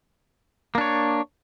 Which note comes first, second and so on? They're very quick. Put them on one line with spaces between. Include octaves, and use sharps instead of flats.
A#3 D4 C#5